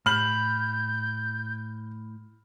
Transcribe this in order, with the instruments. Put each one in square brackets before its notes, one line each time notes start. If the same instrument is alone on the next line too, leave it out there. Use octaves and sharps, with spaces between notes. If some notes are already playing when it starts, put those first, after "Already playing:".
[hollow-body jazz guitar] A2 [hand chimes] B5 [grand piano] F6 F#7 [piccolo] G6